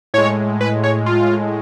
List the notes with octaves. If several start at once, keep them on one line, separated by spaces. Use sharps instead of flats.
A2 G#3 C#5
B4
C#5
F4